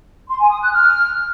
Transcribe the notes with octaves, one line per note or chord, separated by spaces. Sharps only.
C6
G#5
D#6
F#6
F6